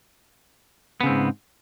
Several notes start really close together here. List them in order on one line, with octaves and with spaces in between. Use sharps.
B3 C#3 C4 G#2